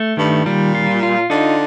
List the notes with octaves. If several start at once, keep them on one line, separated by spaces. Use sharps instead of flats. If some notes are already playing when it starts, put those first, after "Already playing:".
Already playing: A3
G2 D#3
A#2 G3
F4
F4
D3 D#4